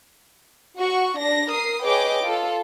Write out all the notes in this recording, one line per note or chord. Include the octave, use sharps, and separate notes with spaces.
F#4 C#6
D4 A#6
A#4 D#6 C7
G#4 B4 C#5 D#5 G5 D6
F4 A4